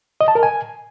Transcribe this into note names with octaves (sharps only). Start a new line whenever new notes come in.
D#5
A5
A#4
G#5